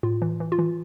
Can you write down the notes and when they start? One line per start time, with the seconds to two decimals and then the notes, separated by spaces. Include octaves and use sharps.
0.03 A2 F4
0.22 E3
0.40 E3
0.52 F4
0.59 E3